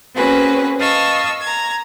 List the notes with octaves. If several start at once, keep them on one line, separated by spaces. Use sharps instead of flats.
A#3 C4 C#4 F#4 G#4 B4
D#5 F5 A5 C#6 D#6 E6
A#5 G#6